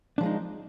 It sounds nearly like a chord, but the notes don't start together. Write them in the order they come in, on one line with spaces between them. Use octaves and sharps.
D4 F3 G#3 D#4